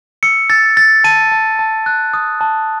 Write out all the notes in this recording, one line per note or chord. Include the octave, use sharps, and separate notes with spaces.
E6 C#7
E6 A6
E6 A6
A5 D#7
A5
A5
F#6
D#6
A5